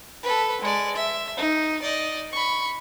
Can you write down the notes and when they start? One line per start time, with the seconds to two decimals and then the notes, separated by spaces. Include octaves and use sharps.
0.23 A4 B4
0.61 G#3 D5
0.96 E5
1.37 D#4
1.82 D5 D#5
2.32 B5 C#6